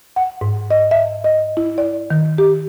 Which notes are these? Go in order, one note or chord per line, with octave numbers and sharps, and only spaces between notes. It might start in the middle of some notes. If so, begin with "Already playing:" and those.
F#5
G#2
D#5
E5
D#5
E4
D5
D#3
G4